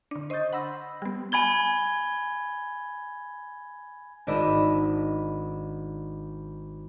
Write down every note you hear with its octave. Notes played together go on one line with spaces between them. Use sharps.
D3 D4
C5 D#5 C#6 D#6 G6 A6
F#5 B5 C6 E6 A#6
G3 B3
G#5 B5 G#6 G7
G#1 D4 D5 D#5 B5 E6